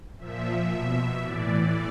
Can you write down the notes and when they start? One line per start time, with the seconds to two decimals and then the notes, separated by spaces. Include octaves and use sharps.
0.19 A#2 F3 E5
0.70 B2 E5
1.22 A2 E3 D5